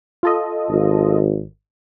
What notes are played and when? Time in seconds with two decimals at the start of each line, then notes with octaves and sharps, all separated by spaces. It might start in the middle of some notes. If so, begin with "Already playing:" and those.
0.23 F4 A4 D#5
0.69 G#1